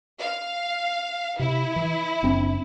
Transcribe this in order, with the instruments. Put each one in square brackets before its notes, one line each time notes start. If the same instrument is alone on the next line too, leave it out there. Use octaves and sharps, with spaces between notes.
[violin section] F5
[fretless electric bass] C3 [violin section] E4
[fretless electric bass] E3
F#1 C4 D4